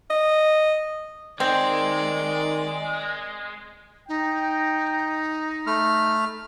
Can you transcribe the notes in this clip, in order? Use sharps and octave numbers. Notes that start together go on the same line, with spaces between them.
D#5
D#3 G#3 C4 D5
D#4 G5
A3 B5 F6